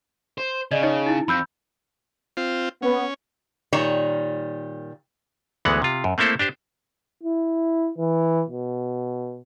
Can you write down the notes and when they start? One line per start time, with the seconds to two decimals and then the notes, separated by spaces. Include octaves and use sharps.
0.38 C5
0.71 C#3 D5 D#5
0.83 D#4 C#5 D#5
1.07 D#4 E4
1.28 F2 B5 E6 G6
2.37 C4 F4
2.82 B3 C#4
3.73 A#2 D#3 G3 C#5 A#5
5.65 D2 E3 G#3 B3 F#5
5.82 C3 F4
6.04 F#2
6.18 A3 A#3 C4 E4 A4 C5
6.39 D4 G4 C5
7.23 E4
7.98 E3
8.49 B2